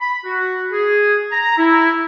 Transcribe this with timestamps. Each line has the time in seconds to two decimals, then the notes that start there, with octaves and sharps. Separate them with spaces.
0.01 B5
0.24 F#4
0.71 G#4
1.31 A#5
1.56 E4